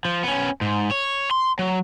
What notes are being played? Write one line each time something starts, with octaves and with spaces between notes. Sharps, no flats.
F3
B3 C#4
G#2
C#5
C6
F#3